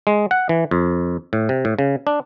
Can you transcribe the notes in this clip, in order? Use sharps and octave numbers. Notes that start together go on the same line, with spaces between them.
G#3
F#5
E3
F2
A2
C3
A2
C#3
D4